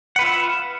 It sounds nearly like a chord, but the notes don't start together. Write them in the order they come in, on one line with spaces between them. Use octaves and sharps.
F#5 B4 F4 E5